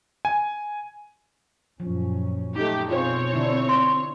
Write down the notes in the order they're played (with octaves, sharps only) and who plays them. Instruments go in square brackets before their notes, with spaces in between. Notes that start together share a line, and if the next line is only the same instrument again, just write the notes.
[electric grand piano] G#5
[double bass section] F#2 A#2 C#4 [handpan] F3
[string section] A3 G4 [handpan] D#4
[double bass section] B2 [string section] C4 C#5 [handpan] F4 G#4 C5
[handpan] D3 D4 E4
[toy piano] C6